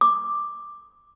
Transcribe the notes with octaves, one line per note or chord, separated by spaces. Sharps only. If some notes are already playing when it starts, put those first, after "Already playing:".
D6